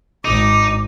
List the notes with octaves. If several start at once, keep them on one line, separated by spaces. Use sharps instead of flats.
G#1 D#4 D6